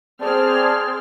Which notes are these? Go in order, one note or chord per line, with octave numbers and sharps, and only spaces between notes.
C4 G#4 D5 A5 F6